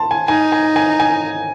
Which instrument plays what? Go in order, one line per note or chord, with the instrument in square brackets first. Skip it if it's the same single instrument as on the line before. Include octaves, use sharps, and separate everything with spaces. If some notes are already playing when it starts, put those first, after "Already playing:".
Already playing: [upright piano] A5 C6
G#5
[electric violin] D#4 [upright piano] G#5
[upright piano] G#5
G#5
G#5